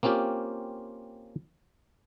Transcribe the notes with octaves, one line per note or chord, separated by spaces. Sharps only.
A#3 C4 C#4 F4 G4